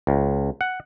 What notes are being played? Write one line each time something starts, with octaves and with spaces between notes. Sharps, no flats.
C#2
F#5